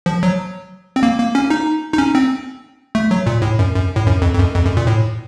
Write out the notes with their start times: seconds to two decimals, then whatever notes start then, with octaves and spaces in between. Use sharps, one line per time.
0.06 F3
0.23 F#3
0.96 C4
1.03 A#3
1.18 A#3
1.35 C#4
1.50 D#4
1.94 D#4
1.98 C#4
2.15 C4
2.95 A3
3.11 F#3
3.26 A#2
3.42 A2
3.59 F#2
3.74 F#2
3.96 A2
4.07 F#2
4.22 F2
4.34 F2
4.39 F#2
4.55 F2
4.65 F#2
4.77 A#2
4.87 A2